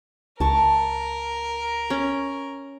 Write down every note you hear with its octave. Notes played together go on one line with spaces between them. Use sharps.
C#2 A#4 A5 C#6
C#4